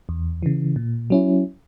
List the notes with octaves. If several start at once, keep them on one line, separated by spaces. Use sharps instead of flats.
E2
C#3 E3
A#2
F#3 C#4 E4